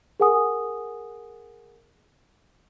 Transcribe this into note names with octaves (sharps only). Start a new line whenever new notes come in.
G#4 A#4 F#5 G#5 D#6